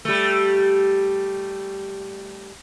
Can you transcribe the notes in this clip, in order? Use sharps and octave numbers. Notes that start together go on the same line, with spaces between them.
G3 A3